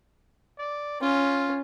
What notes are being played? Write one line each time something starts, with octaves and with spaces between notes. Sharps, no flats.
D5
C#4 F4